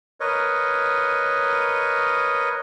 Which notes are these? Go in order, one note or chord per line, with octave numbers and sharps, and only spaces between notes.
A#4 B4 C#5 D#5